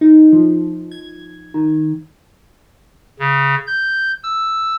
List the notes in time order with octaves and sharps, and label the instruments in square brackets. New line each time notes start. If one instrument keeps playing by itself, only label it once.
[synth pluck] D#4
F3
G#6
D#3
[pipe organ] C#3
G6
E6